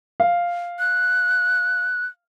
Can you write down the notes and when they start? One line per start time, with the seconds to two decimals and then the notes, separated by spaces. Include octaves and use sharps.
0.20 F5
0.79 F#6